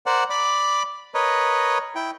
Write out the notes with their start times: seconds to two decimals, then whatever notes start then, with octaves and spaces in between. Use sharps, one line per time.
0.06 A#4 C5 D5 F#5
0.30 D5 B5 D6
1.14 A#4 B4 C#5 D#5
1.95 E4 G5